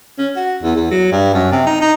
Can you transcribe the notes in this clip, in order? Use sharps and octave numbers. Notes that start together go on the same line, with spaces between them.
C#4
F#4
E2
E2
F#3
G2
F#2
C3
D#4
D#4